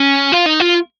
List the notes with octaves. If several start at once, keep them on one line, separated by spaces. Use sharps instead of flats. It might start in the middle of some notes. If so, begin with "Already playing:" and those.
Already playing: C#4
F4
D#4
F4